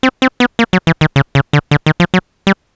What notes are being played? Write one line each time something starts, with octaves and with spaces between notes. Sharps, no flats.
C4
C4
B3
A#3
F#3
E3
D#3
C#3
C#3
D3
D3
D#3
F3
F#3
G3